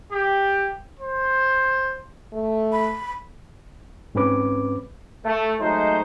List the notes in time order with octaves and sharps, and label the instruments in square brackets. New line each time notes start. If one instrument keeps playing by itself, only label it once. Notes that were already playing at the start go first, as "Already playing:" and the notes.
[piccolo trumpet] G4
C5
[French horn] A3
[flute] B5
[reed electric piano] G#2 C4 C#4 B4 D6
[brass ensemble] A3
F#3 G#3 A3 D#4 C5